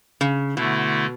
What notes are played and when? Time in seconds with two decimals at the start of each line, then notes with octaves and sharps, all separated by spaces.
0.21 C#3
0.56 B2 D3 A3 E4